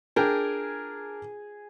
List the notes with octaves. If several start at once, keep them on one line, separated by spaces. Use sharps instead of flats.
D4 G#4 A#4 G5